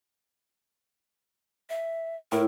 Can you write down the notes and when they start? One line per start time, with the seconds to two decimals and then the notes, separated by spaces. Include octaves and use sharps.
1.70 E5
2.32 A2 A#4